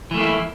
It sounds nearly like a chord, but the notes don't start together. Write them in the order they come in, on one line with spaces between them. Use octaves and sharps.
E3 A3 A#3 E4